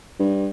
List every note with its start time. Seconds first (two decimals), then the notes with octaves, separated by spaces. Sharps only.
0.19 G2